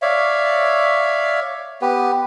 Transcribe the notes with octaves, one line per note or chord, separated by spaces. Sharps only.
C#5 D5 E5 F5
B3 G4 B4